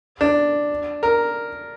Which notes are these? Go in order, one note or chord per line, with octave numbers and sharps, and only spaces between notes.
D4
A#4